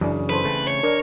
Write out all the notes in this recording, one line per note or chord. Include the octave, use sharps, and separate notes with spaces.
F#2 C#3 E3 D4
E3 A4 B4 C5
C#3 A3 C4
C#5
D4 A#4